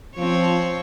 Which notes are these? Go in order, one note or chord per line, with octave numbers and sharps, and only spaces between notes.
F3 C4 C#5